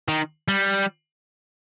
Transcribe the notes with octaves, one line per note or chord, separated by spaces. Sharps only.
D#3
G3